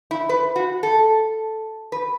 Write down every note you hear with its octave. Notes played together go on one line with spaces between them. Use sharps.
E4
B4
F#4
A4
B4